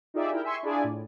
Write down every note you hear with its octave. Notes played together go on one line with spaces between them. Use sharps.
D#4 F4 G4 G#4 D5 E5
E4 A#4 G5
E5 G#5 C6 C#6
D4 E4 F4 G#4 D5 G#5
A2